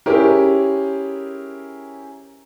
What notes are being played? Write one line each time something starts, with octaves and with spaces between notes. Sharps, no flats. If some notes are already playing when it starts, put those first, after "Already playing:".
C#4 E4 G4 G#4 A#4 C5